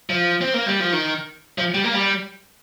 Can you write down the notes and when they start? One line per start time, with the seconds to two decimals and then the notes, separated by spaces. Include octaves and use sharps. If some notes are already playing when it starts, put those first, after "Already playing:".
0.10 F3
0.41 C4
0.54 A#3
0.66 G3
0.80 F3
0.92 D#3
1.58 F3
1.74 G3
1.84 A#3
1.94 G3